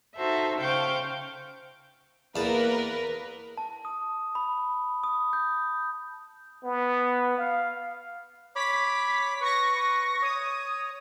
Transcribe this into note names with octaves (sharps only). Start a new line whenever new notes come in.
D#4 F#4 A4 C5 E5
C#3 C5 F5 G5 C#6 G6
E2 A#3 A#4 B4 A5
A5
D#6
B5
D#6
G6
B3
F5
C#5 B5 D6 B6
B4 C#6 A#6
C#5 D#6